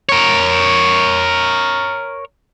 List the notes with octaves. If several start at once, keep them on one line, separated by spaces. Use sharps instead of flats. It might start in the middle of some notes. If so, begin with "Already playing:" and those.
A#4 C#5